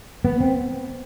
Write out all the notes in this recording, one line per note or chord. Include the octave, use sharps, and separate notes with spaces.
B3
C4